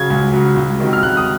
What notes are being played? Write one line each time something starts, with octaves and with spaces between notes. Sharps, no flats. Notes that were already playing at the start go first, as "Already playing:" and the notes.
Already playing: C#3 F#3 G#6
C#2
C#3 F#3
C#2
C3 D#3 F#3
F6
C#2 F#6
D#6